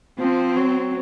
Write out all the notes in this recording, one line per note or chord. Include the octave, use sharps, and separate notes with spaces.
F3 C4
F#3